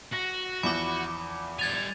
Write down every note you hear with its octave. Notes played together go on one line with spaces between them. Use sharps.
F#4 A#6
E2 F3 E4 B5 D6
G3 G#5 G#6 A6 F7